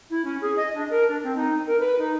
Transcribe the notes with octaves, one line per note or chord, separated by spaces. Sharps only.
E4
C#4
G#4
D#5
D4
A#4
D4
C4
D#4
A#4
B4
D#4